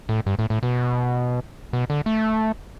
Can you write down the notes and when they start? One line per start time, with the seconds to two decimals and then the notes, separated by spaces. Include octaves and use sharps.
0.09 A2
0.26 G2
0.39 A2
0.50 A2
0.63 B2
1.73 B2
1.90 D3
2.06 A3